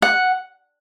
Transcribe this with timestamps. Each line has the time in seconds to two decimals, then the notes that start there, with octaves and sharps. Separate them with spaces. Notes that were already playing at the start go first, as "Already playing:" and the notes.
0.02 F#5